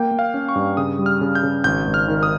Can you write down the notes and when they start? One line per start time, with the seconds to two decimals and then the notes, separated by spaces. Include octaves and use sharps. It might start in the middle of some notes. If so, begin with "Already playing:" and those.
Already playing: A#3 G5
0.11 A#3
0.19 F5
0.34 C#4
0.49 C#6
0.56 G2
0.77 C#3 D#6
0.99 G3
1.06 F6
1.21 C#3
1.35 G6
1.43 C#3
1.64 G#1 G6
1.87 G#1
1.94 F6
2.08 D#3
2.23 D#6